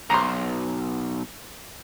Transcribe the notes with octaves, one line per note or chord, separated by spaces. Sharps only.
B1 A#5 C6